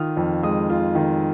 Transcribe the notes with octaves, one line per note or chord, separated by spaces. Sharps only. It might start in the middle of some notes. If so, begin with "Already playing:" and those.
Already playing: D#3 F4 D#6 F6
F2
G#3 D#6
F4
D#3